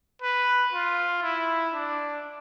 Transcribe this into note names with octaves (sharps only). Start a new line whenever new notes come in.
B4
F4
E4
D4